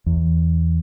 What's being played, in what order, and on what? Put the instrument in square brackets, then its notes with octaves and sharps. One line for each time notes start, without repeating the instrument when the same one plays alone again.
[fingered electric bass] E2